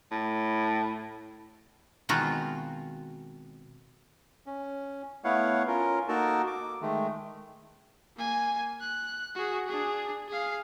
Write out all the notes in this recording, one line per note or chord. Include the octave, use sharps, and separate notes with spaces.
A2
B2 D#3 G#3 C4 F4 F#4
C#4
A3 B3 E4 C#5 F5 F#5
C#4 F4 A#4
A#3 D#4 F#4 A4 A#4 A5
D6
D#3 G#3 A3
A#3 G#5
F#6
F#4 G#4
D4 G#4
G#4 F5